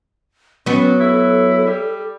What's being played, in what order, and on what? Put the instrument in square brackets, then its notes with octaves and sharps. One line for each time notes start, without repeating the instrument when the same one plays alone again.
[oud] F#3 B3 [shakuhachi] C#4
[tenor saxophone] E4 [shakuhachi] A4
[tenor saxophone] G3